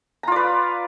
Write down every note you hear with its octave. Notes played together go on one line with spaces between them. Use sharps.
F4 B4 D5 A#5